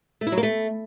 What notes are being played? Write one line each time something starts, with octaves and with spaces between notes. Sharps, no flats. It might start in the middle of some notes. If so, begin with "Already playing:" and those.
A3
E4
F#3
A#3
A3